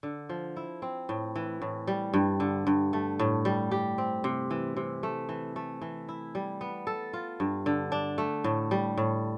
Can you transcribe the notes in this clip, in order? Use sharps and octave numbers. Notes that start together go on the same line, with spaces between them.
D3
F3
E4
C4
A2
E3
A2
G3
G2
D3
G2
A3
A2
G3
G4
C4
C3
E3
C3
A3
E3
A3
E3
E4
G3
B3
A4
F4
G2
D3
D4
A3
A2
G3
A2